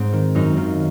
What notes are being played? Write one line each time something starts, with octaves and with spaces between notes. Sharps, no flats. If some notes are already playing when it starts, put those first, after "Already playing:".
Already playing: G#2 C4
D#3
F#2 D#4
D#3 F4